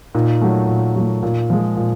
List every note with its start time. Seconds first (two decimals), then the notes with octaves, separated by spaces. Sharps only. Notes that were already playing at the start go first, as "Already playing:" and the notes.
0.15 A#2 D#4
0.41 F#3 A3
0.68 A#2
0.96 F#3 A3
1.23 A#2
1.50 F3 G#3
1.77 A#2